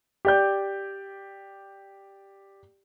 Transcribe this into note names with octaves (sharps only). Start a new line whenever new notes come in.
G4 D5 G6